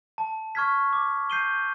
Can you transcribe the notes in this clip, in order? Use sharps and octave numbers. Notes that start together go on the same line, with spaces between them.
A5
C#6 F6 G#6 B6
D6
G6 C7 D#7 G7